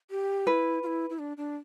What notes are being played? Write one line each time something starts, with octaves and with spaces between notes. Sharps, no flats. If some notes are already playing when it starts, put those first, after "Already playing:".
G4
E4 B4
F4
E4
E4
D4
D4